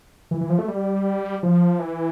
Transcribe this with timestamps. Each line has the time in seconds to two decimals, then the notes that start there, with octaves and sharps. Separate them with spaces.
0.31 E3
0.41 E3
0.50 F3
0.59 A3
0.68 G3
1.43 F3
1.79 E3